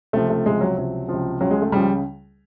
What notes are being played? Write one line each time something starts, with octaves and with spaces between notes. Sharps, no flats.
C#2 C3 F3 A3
A3
C#2 C3 F3 G#3
F#3
C#2 C3 F3 F#3
C#2 C3 F3
C#2 C#3 F3 F#3
G#3
A3
C#2 C#3 F3 G3